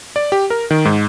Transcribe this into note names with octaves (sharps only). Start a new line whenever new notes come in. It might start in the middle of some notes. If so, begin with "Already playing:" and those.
D5
G4
A#4
D#3
G#2